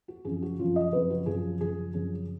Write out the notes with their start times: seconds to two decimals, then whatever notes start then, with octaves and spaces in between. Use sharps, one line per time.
0.08 F#4
0.25 F#2 C#3 F3 G#4
0.42 F#4
0.59 F#2 C#3 F3 F4
0.76 D#5
0.92 F#2 C#3 F3 B4
1.10 F#4
1.26 F#2 C#3 F3 G#4
1.60 F#2 C#3 F3 G#4
1.94 F#2 C#3 F3 G#4